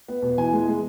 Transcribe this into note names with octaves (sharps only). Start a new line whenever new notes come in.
B3
B2
E3 G#5
G#3
G#3